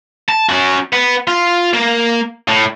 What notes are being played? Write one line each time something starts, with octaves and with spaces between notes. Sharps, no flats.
A5
C#4 F#4
B3
F4
A#3
A2